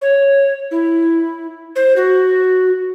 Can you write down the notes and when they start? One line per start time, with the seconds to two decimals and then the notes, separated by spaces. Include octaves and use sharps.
0.02 C#5
0.71 E4
1.76 C5
1.97 F#4